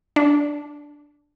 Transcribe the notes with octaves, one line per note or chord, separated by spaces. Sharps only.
D4